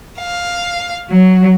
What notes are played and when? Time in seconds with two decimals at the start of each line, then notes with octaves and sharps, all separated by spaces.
0.19 F5
1.10 F#3